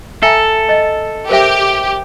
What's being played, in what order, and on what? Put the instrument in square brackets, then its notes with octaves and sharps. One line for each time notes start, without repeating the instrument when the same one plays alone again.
[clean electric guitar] A4 [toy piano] E5 G#5 A#5
[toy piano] D#5
[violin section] G4 [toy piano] A#4 C5 E5